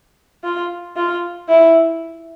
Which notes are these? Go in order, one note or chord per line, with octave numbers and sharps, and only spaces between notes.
F4
F4
E4